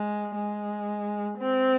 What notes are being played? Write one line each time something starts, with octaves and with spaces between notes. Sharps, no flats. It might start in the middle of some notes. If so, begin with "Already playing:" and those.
Already playing: G#3
G#3
C4